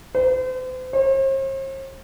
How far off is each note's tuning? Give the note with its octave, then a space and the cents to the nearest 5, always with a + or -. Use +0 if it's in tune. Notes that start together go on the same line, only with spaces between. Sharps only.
C5 -40
C5 +45